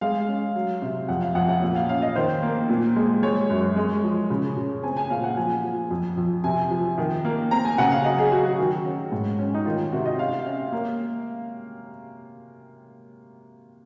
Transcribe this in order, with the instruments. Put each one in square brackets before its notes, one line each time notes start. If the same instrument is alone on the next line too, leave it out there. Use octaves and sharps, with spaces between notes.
[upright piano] G#3 F5
C#4
F#3
C3
F2 F#5
F5
F2 F#5
F#5
A#2
F5
C#4 F5
D#5
D#3 C5
A#3
A#2
G#3
G#3 C#5
F#2
G#3
F3
C#3
C#3
C4 G#5
G#5
A#2 F5
F#5
F3 G#5
F3
F2
F2
C3 G#5
F3
D#3
A#3
C4 A#5
G#5
C#3 F#5
F5
F#3 D#5
G#4
F#3 F#4
F#4
D#3
C#4
G#2
C#4
D#4
D#3 F4
C3 F#4
D#5
C#4 F5
C#4
A#3